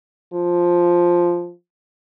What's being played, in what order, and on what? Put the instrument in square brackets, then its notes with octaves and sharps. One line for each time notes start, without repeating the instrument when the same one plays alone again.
[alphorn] F3